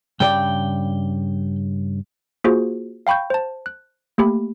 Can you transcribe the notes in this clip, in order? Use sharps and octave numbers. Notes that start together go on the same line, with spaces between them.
G2 C#3 D5 G5
A#3 F4 F#4 G#4 C5
F5 G5 B5 C#6 G6
C5 A5
F#6
A3 A#3 G4 B5